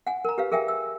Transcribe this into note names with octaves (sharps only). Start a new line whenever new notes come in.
F#5 G#5
A#4 A#5
G4 B4 F5
G#4 A#4 E5 G5 G#5
E6